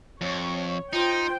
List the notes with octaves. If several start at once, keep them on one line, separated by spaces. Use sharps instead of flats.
F2 C#5
D#4 F4 C5 G5